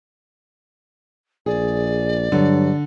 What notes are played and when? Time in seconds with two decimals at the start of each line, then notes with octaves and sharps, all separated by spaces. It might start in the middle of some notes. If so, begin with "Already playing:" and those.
1.46 A#1 G#4 D5
2.32 G2 D3 F#3